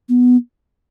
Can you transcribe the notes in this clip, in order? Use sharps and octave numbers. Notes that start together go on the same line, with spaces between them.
B3